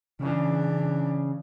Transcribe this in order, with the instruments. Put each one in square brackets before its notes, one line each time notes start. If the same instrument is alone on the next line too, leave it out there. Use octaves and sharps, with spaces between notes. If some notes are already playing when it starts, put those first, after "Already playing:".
[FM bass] C#3 [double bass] E3 D4